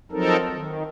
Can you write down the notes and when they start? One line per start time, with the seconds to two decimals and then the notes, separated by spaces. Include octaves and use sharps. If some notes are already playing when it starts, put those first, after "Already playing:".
0.12 F3 F#3 C4 D#4 A4 A#4
0.52 D#3